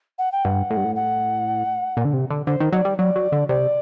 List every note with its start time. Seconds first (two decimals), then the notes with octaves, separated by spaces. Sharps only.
0.18 F#5
0.32 G5
0.44 G2 F#5
0.70 A2
0.77 G2
0.85 A2
0.96 F#5
1.97 A#2
2.05 D3
2.13 C3
2.30 D3
2.47 D3 C5
2.60 D#3
2.72 F#3 D#5
2.77 D5
2.85 G3
2.98 F#3 D5
3.16 F#3
3.32 D3
3.49 C3 D5